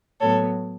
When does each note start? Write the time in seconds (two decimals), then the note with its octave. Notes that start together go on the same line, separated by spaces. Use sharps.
0.20 A2 F#3 B3 A4 C#5